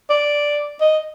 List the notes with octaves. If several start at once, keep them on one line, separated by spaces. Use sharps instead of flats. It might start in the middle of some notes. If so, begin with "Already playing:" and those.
D5
D#5